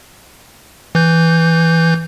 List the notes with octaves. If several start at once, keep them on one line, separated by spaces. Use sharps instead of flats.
E3 G6